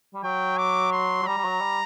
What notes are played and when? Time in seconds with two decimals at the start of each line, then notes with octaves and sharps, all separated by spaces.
0.14 G3
0.23 F#3 G5
0.58 D6
0.92 C6
1.22 F#3
1.27 G3 A#5
1.37 G3
1.44 F#3
1.61 G3